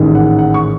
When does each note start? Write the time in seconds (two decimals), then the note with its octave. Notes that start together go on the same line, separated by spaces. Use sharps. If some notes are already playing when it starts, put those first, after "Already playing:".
Already playing: A1 G#2 D#3
0.15 F#5
0.39 F#5
0.54 C#6